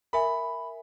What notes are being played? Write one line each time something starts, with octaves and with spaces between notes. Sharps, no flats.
A#4 E5 G#5 B5